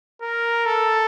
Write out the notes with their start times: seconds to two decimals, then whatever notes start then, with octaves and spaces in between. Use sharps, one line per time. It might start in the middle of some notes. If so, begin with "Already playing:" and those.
0.22 A#4
0.66 A4